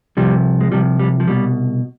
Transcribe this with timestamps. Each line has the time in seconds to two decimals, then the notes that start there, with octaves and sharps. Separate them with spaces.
0.17 C2 C3 F3 G3
0.61 G#3
0.72 C2 C3 F3 G3
0.99 G3
1.20 F3
1.28 C2 B2 G3